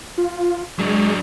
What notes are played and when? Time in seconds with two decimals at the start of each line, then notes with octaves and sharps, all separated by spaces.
0.18 F4
0.79 F#3 G#3 D4